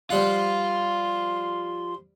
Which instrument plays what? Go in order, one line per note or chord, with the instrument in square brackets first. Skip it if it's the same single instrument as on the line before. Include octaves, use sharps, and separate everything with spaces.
[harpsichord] F3 G3 F#5 [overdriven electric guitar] F4 [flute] C6